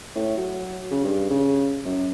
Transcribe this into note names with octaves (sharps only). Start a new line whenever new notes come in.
A2
F#3
C#3
G2
C#3
F#2